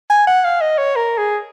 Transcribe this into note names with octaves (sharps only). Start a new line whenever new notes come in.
G#5
F#5
F5
D#5
C#5
A#4
G#4